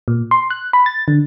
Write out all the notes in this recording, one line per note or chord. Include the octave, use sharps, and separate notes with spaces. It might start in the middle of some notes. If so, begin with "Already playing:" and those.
A#2
C6
F#6
B5
A6
D3